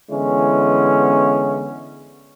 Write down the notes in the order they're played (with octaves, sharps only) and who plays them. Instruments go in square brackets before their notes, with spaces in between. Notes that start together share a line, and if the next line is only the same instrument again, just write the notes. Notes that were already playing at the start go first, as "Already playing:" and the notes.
[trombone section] D3 E3 G#3 B3 C#4 E4